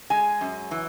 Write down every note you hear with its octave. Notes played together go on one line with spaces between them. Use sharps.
G#3 G#5
F#2
E3